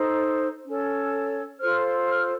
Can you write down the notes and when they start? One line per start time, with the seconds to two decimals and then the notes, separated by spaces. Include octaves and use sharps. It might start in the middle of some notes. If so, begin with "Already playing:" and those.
Already playing: D#4 A4 C5
0.66 C#4 A4 C#5
1.59 F4 A4 C5 F6
2.06 F6